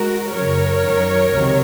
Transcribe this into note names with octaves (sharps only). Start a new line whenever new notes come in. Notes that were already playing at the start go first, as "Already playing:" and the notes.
Already playing: G#3 F#4 A#4
F#2 C#3 F#3 A#4 C#5
F#2 D#3 F#3
C#2 C3 D#3 F#3